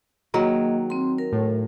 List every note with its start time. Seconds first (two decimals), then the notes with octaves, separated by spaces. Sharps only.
0.34 D#3 F#3 A#3 G#4 D#5
0.90 C4 C6
1.18 A#4
1.32 A2